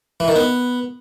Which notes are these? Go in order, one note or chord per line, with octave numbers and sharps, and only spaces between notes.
E3
D#3
B3